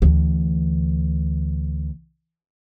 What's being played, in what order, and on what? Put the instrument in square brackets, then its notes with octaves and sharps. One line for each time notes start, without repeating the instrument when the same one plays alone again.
[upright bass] D2 E3